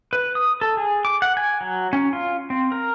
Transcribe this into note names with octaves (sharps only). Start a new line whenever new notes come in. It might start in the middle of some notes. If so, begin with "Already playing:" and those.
B4
D#6
A4
G#4
D6
F#5
G#5
F#3
C#4
F4
C4
A#4